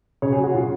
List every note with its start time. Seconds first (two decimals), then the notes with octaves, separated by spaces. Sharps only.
0.22 C#3 C#5
0.33 G#4
0.38 F#3
0.43 F#4
0.54 C#3 F4